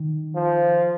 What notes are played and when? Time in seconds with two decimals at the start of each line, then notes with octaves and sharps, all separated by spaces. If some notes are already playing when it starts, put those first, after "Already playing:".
Already playing: D#3
0.36 F3